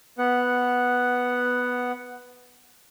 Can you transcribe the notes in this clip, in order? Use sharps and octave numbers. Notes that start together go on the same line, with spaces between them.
B3 F#5